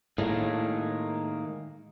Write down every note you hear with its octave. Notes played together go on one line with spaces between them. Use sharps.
A2 D#3 G#3 A#3